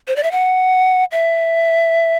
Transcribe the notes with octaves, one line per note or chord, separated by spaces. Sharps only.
C5
D5
E5
F#5
E5